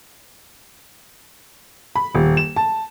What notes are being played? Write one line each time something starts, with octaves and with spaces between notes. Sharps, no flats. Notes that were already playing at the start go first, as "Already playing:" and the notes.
B5
D#1
E7
A5